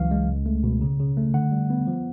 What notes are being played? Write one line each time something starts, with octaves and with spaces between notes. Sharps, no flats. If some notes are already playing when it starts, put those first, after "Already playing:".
Already playing: C#2 E3 F#3 F5
G#3
C#2
A3
B2
C#3
C#3
A3
D3 F#5
G3
B3
F3